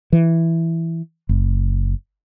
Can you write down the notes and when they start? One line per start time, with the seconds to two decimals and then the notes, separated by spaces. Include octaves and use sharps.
0.13 E3
1.29 F#1